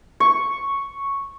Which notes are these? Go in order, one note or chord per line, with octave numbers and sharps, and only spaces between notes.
C#6